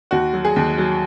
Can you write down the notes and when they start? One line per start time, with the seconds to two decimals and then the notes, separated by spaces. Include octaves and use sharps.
0.11 D#2 F#4
0.33 F#3
0.45 G#4
0.56 D#2
0.78 F#3